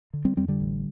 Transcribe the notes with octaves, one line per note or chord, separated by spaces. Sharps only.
D3
G3 C4
F2 G3 C4
D3 G3
A1